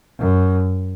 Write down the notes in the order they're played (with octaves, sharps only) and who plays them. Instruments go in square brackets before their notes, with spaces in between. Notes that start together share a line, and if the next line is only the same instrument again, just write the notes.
[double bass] F#2